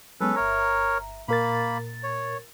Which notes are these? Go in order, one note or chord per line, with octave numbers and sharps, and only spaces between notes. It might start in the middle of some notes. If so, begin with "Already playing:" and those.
F#3 G#3 B3 C#4 A4 B4
G1 A#4 C#5 E5 A#5
A#2 A#3 A#4 B5 A6
C#5